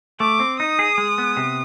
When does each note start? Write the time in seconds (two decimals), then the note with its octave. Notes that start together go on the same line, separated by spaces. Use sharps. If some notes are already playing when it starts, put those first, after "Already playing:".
0.20 A3 D6
0.40 C4
0.60 D#4 D#6
0.79 G#4
0.98 G#3
1.18 B3
1.37 C3